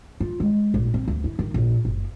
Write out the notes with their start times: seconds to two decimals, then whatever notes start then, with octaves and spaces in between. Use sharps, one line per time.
0.20 F4
0.40 G#3
0.74 A#1
0.94 C4
1.08 D2
1.24 E4
1.39 D#3
1.54 A#1
1.85 F#1